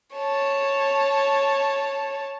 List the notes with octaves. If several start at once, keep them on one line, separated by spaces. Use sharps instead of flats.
C#5 A5